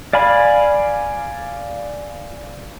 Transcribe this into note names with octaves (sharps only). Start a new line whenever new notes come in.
D5 F5 G#5 B5